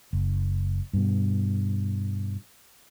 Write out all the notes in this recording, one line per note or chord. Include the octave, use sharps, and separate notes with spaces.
F#1
G2 B2